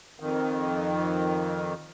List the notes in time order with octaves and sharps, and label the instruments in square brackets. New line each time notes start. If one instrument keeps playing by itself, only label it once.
[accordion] F2 D#3